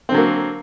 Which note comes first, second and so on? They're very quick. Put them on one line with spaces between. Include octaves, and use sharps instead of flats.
C4 D3 F#3 A#3